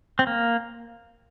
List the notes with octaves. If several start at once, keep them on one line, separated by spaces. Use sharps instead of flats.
C4
A#3